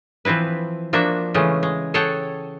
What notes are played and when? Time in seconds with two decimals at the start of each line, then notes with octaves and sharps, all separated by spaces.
0.25 E3 F3 C4 E4 B4
0.93 F3 A#3 D4 F#4 E5
1.34 C#3 E3 G#3 A3 C#4
1.63 G#3
1.94 G#4 A4 C#5 F#5 G5 A5